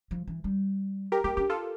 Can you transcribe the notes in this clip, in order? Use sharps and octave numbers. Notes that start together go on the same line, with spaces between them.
F3
E3
G3
G4 A#4
A#3 G4
D4 G4
F4 A4